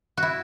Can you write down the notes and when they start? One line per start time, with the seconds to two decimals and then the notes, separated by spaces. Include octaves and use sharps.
0.17 F#4
0.23 E4